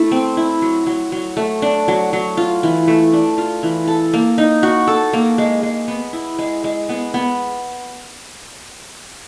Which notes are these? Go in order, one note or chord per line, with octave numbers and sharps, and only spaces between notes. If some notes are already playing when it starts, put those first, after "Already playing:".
Already playing: A3 E4
C4
E4
F#3
F#3
F#3
A3
D4
F#3
F#3
F4
E3
A3
D4
F4
E3
A4
A#3
D#4
F#4
A4
A#3
G#3
G#3
B3
E4
G#3
G#3
B3
B3